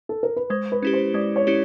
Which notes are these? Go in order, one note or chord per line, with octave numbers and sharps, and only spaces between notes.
A4
A#4
B4
G#3 C5
B4
C#4 E4 G4
C5
G#3 D5
C#5
C#4 E4 G4